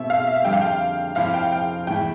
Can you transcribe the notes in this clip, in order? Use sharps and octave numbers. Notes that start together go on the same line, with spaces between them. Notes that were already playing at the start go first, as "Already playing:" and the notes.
Already playing: B2 A3 C4 E5
F5
E5
F2 D3 G3 G5
F5
G5
F2 C3 F3 C4 E4 F5
G5
G5
E2 B2 A3 E4 G5